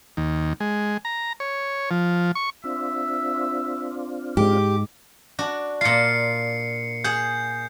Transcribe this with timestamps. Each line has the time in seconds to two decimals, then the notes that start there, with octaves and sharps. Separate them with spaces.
0.17 D#2
0.60 G#3
1.05 A#5
1.40 C#5
1.91 F3
2.35 C#6
2.64 C4 D4 F4 E5
4.37 G#2 G#3 G4 D6
5.39 D4 F#4
5.81 A#2 F4 C7 C#7
7.04 G#4 F#5 G6